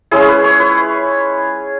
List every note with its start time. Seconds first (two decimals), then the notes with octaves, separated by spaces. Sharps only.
0.11 G#3 C#4 E4 G#4
0.28 B4
0.44 C#5
0.60 B4